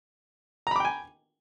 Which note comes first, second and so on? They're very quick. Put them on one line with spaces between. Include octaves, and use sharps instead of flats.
A#5 B5 D6 G5 G#5